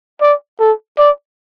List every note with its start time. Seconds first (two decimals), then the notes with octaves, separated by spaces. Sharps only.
0.21 D5
0.60 A4
0.98 D5